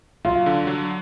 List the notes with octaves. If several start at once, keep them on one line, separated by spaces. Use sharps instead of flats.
F#3 F4
D3
F#3